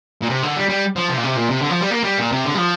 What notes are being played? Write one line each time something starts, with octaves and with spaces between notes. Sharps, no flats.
A#2
C3
D3
G3
G3
F3
C3
A#2
C3
A#2
C3
D3
F3
G3
A#3
G3
A#2
C3
D3
G3
F3